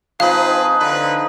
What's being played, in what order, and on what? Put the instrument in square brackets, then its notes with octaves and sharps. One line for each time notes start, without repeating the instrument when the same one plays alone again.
[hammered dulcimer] F3 D#4 [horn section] C4 G#4 B4 [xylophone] F5
[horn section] D3 B4